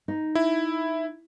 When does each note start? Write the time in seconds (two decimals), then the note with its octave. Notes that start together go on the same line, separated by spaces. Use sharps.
0.08 D#4
0.35 E4